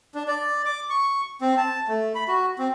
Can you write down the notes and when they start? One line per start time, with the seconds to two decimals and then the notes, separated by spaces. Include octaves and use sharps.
0.15 D4
0.28 D5
0.65 D6
0.90 C#6
1.41 C4
1.57 A5
1.88 A3
2.15 B5
2.28 F#4
2.58 C4